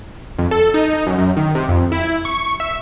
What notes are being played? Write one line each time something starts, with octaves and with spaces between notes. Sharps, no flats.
F2
A4
D#4
F#2
F#2
D#3
C3
F2
E4
C#6
E5